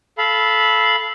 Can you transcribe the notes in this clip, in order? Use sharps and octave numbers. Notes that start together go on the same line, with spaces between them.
A4 F5 B5